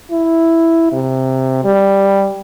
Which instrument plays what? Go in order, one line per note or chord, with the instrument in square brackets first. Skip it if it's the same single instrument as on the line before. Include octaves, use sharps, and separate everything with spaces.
[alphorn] E4
C3
G3